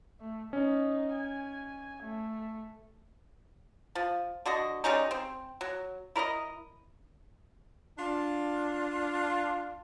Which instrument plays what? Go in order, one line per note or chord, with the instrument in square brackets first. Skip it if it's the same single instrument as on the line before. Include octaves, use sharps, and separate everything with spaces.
[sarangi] A3
[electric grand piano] C#4 [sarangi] D#4
[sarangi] G#5
A3
[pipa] F3
D3 F#4 D#5
G3 G#3 C#4 D#4
C4
F#3
E4 A#4 D5 D#5
[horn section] D4 F4